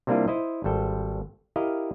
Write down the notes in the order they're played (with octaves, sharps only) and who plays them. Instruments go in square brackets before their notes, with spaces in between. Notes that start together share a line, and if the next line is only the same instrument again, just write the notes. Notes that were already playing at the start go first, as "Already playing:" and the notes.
[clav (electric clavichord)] C3 G3 A#3 D4 E4 F4
E4 C5 D#5
G#1 G3 A4 G5
E4 G4 A#4 D#5 F5